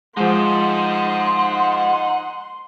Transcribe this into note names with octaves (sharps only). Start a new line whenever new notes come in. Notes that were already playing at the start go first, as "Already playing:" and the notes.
F3 G#3 D#4 C5 F#5 C6